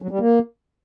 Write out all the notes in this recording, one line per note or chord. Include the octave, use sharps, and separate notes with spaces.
F#3
G3
A#3